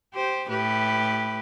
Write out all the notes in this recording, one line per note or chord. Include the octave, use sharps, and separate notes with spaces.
G4 C5
A2 G4 B4